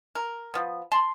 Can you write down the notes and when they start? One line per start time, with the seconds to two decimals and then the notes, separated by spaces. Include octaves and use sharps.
0.15 A#4
0.54 F3 B3
0.92 A5 C6